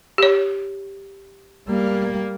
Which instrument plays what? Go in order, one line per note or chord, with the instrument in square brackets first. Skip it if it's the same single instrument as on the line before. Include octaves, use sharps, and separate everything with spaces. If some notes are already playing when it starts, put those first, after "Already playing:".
[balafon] G4 C#5
[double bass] G3 A#3